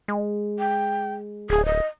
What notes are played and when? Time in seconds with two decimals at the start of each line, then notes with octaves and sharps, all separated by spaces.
0.08 G#3
0.59 G5
1.50 D1 G#4
1.65 D#5